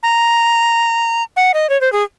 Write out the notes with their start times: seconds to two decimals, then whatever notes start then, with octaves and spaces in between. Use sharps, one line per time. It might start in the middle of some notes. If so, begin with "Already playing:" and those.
0.03 A#5
1.36 F#5
1.54 D#5
1.70 C#5
1.81 C5
1.93 G#4